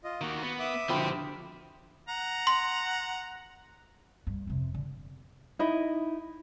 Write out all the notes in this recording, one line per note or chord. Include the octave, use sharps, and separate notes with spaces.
F4 D#5
D#3 A#3 F#4
B3
E5 D6 D#6
D3 F3 F#4 G4 C5 G5 B5
F#5 A#5
C6
G2
F2 C3
D3
D#4 E4 D#5